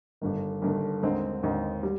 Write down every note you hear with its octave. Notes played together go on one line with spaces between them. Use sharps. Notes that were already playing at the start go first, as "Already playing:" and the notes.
G1 G2 D#3
G1 G2 D#3
D#2 D3 G#3 C4 D#4
D#2 D3 G#3 C4 D#4
G3